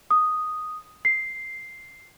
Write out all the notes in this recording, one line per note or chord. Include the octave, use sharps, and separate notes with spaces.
D#6
C7